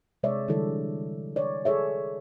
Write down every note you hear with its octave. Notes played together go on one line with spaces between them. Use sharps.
C3 G#3 C#5 D5 E5
D3 E3 G3 G#3 E4 A4
C#5 D5
G#4 A4 C#5 E5